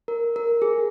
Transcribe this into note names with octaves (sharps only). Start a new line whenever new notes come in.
A#4
A#4
G#4